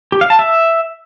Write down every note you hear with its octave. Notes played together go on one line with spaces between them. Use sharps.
G4
F5
A5
E5